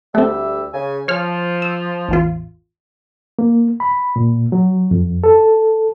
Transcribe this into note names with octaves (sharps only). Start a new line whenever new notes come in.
D2 G3 A3 C4 E5
C#3 G#5
F3 C#5 F6
E6
A1 E2 F4
A#3
B5
A#2
F#3
F2
A4